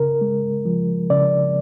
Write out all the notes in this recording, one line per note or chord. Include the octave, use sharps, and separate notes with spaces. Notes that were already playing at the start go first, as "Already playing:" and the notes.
Already playing: C#3 A#4
G#3
F3
C#3 D5